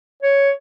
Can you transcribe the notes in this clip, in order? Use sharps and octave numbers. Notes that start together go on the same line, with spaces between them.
C#5